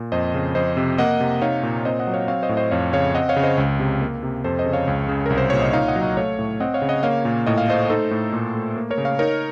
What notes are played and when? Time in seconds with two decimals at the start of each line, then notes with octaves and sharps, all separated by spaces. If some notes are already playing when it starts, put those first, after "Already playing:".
Already playing: A#2
0.12 F2 C5 D#5
0.34 C#3
0.55 F2 C5 D#5
0.77 C3
0.98 A#3 D#5 F#5
1.21 C3
1.42 D#4 C#5 F5
1.63 A#2
1.85 C4 C5 D#5
2.00 D#5 F#5
2.07 F#3
2.14 C#5 F5
2.28 C4 C#5 F5
2.43 C5 D#5
2.49 A2
2.57 C5 D#5
2.71 F2 C#5 F5
2.93 C#3 C#5 F5
3.15 C4 D#5 F#5
3.29 C#5 F5
3.36 C#3
3.43 C5 D#5
3.58 C#2
3.79 C3
4.01 A#3
4.23 C3
4.44 F2 A4 C5
4.59 C5 D#5
4.66 C#3
4.73 C#5 F5
4.87 C#2
5.08 C#3
5.26 C2 A#4
5.38 C5
5.50 A#2 C#5
5.62 D#5
5.73 D#4 C#5 F5
5.88 D#5 F#5
5.96 F#3
6.02 D#5 F#5
6.17 A3 C#5 F5
6.39 A2
6.60 C4 D#5 F#5
6.74 C#5 F5
6.82 C#3
6.89 D#5 F#5
7.03 A#3 C#5 F5
7.25 A#2
7.46 A2 D#5
7.58 F5
7.68 A3 C5 D#5
7.90 D#4 A4 C5
8.11 A2
8.33 A#2
8.55 A3
8.76 A#3
8.90 A#4 C#5
8.98 C#3
9.05 C#5 F5
9.19 D#4 A#4 C#5